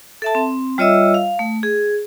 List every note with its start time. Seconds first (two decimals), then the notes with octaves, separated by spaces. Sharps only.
0.22 A4 E5 A5
0.35 C4
0.78 G3 F4 C#5 D#5 E5 E6
1.14 F5
1.39 A3
1.63 G#4